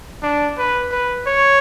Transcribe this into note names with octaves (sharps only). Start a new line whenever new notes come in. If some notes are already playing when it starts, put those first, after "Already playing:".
D4
B4
B4
C#5